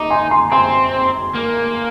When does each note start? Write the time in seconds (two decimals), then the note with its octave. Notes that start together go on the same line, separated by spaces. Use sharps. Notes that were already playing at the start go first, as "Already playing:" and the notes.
Already playing: D#4 A#5 D6
0.10 G#5 C6
0.31 G#5 C6
0.52 C4 G#5 C6
1.35 A#3